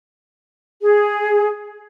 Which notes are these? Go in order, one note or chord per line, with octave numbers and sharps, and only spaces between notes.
G#4